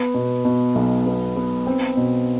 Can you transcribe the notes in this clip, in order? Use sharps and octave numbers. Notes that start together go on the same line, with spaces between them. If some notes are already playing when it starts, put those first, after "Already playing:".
Already playing: B3
B2
B2
B1
B3
B3
C4
B2